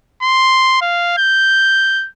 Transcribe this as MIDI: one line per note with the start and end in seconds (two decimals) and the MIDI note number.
0.23 0.78 84
0.82 1.18 77
1.18 2.08 91